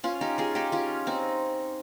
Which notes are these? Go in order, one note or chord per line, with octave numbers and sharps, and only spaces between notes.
C#4 F4
D#4 G4
F4 G#4
D#4 G4
C#4 F4
C4 D#4